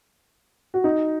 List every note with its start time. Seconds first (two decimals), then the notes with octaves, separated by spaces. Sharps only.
0.74 F#4
0.84 D#4